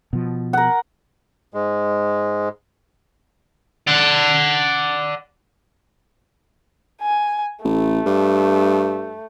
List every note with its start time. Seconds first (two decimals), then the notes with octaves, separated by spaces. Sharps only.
0.13 B2 F3
0.53 A#4 F#5
1.54 G#2 G#3
3.87 D5 F#5
7.02 G#5
7.65 A1 A3
8.06 G2